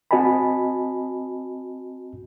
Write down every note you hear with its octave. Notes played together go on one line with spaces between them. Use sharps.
C4 F#4 D#5 G#5 A5 B5